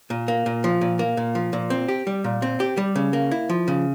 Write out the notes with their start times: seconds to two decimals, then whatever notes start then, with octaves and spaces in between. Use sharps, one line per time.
0.10 A#2
0.28 A#3
0.46 A#2
0.64 F3
0.81 A#2
0.99 A#3
1.17 A#2
1.35 F3
1.53 A#2
1.70 C4
1.88 G4
2.07 G3
2.24 A#2
2.42 C4
2.60 G4
2.77 G3
2.95 C#3
3.13 A#3
3.31 E4
3.49 F3
3.68 C#3